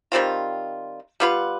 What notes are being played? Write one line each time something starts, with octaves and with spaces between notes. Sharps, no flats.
D#3 G3 C4 F4
G3 B3 F4 B4